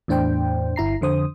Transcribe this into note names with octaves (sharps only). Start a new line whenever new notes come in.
E2 A2 D4 C5 G5
G1 E4 A#5 C7
F2 D3 C5 D#6